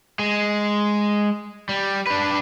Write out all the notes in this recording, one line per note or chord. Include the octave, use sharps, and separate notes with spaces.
G#3
G3
D4 B4